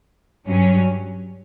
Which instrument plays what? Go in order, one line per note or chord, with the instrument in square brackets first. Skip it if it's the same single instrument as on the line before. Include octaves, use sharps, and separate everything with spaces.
[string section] G2 F#3 C#4